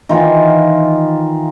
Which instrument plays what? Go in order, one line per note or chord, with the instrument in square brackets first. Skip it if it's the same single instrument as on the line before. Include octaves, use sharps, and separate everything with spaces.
[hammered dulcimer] D#3 E3 F4